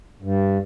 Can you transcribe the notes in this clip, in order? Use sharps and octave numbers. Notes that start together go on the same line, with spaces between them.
G2